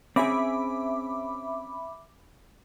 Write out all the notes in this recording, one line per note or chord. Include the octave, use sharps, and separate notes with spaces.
C4 C#4 G#4 E5 B5 D6